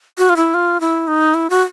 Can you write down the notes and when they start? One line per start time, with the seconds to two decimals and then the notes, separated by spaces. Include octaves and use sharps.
0.18 F#4
0.29 F4
0.37 E4
0.54 F4
0.81 E4
1.08 D#4
1.34 E4
1.50 F#4